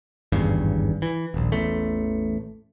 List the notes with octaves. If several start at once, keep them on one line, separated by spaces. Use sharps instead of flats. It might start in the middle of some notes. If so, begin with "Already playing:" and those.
G#1 E2 G2 C#3
E3
D#1 A#1
A1 E2 A3